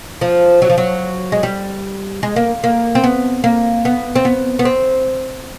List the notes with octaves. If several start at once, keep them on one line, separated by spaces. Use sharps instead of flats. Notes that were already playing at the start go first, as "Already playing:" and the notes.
F3
F#3
F3
F#3
G#3
G3
G#3
A#3
A#3
C4
B3
A#3
B3
C4
B3
B3
C4